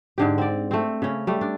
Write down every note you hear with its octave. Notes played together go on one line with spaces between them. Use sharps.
G#2 D3 G4
C4 D5
A3 C4
C#3 C#4
G3 A3
D4